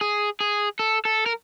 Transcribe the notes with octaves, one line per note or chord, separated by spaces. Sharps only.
G#4
G#4
A4
A4
A#4